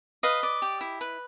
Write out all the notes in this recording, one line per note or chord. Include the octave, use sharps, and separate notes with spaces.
B4 D#5 F5
D5
G4
E4
B4